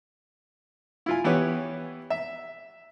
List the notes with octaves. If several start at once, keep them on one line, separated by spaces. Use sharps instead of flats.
E4 F4 G#5
E3 B3 G4 C#5
E5